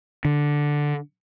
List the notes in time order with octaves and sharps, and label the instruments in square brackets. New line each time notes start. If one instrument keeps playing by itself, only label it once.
[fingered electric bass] D3